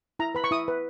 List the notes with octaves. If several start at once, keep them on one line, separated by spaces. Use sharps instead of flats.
E4 A#5
B4 B5
C#6
E4 D#6
B4